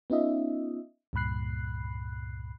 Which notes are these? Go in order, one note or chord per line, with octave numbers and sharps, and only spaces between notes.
B3 C#4 D#4 F4 D#5 E5
C#2 G2 A#2 B5 F#6 C7